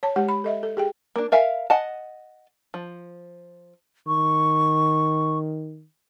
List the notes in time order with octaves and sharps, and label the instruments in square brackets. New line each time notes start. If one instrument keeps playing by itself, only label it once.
[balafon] C#5 A5
G#3 G4 F#5
B5
A4 D#5 E5
A4
G4 G#4 G5
[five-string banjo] A#3 D4
A#4 E5 F5 G#5
D#5 F#5 G#5 A5
F3
[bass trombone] D#3 [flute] C#6